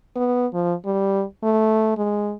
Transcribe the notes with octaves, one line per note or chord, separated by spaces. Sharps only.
B3
F3
G3
A3
G#3